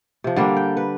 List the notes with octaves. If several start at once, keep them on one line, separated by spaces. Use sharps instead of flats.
C3 F3
D3 G3 A#3 D4
G5
B4